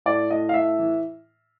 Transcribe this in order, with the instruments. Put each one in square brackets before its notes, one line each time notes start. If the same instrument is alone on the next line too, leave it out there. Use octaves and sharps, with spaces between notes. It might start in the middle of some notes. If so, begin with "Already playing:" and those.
[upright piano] A2 D5
A2 D#5
F5
A2 E5
E3